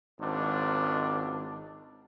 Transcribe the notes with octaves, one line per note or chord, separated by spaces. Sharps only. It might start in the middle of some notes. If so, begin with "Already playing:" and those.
G#1 C#2 G#2 D4